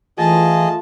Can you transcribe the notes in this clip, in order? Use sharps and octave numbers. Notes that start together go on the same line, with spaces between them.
E3 A3 F4 G#4 D#5 A5